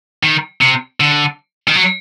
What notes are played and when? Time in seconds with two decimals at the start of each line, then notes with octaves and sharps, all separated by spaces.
0.23 D#3
0.61 C3
1.00 D3
1.68 D#3
1.76 F#3